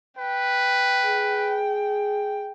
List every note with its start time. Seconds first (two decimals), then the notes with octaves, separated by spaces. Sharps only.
0.18 B4 G5
1.05 G#4